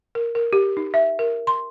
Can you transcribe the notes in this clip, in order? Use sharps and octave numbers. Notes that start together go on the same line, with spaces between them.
A#4
A#4
G4
D#4
E5
A#4
C6